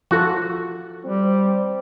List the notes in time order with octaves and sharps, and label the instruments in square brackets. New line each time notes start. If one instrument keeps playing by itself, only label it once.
[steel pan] F3 F4 A4 [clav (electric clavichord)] F#4
[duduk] G3 [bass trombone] C4